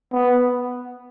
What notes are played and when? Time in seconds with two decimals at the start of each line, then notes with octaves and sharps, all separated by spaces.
0.13 B3